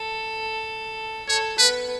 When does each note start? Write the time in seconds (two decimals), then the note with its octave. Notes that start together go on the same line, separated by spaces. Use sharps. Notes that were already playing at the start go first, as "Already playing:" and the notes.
Already playing: A4
1.28 A4 C#5
1.59 B3 B4